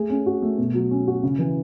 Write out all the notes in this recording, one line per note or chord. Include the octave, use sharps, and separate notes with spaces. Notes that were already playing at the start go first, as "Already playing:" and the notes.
Already playing: A3 G#4
C#4
F#4
A3
B2
F#3
C#4
F#4
C#3
E3